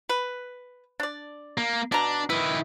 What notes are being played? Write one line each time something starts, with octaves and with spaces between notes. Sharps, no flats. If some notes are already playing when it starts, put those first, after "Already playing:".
B4
D4 D5
A#3
B2 D4 A#5
D#3 E4 B4